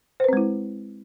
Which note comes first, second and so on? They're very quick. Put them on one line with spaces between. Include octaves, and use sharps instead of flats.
C5 B4 C4 G#3 E4